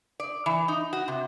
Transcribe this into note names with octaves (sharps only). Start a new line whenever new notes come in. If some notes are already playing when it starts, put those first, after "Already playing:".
D5
E3
D#4
F#4
C3